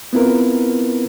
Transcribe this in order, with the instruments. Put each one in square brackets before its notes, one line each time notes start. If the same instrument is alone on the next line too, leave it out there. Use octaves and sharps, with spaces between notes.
[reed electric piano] B3 C4 E4 F4 A#4 B4